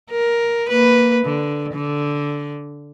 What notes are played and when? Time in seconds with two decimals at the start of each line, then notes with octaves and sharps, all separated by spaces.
0.10 A#4
0.69 A#3 B4
1.25 D3
1.74 D3